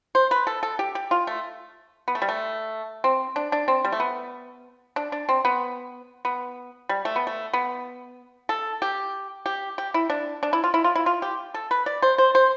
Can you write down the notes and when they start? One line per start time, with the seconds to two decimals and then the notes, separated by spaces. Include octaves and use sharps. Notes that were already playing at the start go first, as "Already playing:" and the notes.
0.15 C5
0.31 B4
0.47 A4
0.63 A4
0.79 G4
0.95 G4
1.11 F4
1.27 A3
2.08 B3
2.15 A3
2.22 G3
2.28 A3
3.04 C4
3.36 D4
3.52 D4
3.68 C4
3.85 G3
3.92 A3
4.00 B3
4.96 D4
5.12 D4
5.29 C4
5.45 B3
6.25 B3
6.89 G3
7.05 A3
7.16 B3
7.27 A3
7.53 B3
8.49 A4
8.82 G4
9.46 G4
9.78 G4
9.94 E4
10.10 D4
10.43 D4
10.53 E4
10.64 F4
10.74 E4
10.84 F4
10.95 E4
11.06 F4
11.22 G4
11.54 A4
11.71 B4
11.86 D5
12.02 C5
12.18 C5
12.35 C5